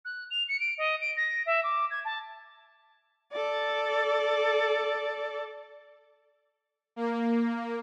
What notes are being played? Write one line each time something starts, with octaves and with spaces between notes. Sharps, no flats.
F#6
F7
C#7
D7
D#5
D7
A#6
E5
D6
G#6
A5
A4 D5
A#3